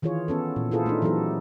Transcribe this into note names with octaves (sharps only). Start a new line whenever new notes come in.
D#3 E3 F4 G#4 C#5
B3 C#4 A4
A#2
E4 F4 G#4 A4 C5
A3 D4 D#4
E3 F#3 B3 G4 A4